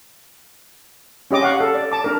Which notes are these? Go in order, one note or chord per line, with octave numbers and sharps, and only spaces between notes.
C#4 G4 D#5 D6
F5 F#5 C#6
A4
D5
A5 D6
D4 A#4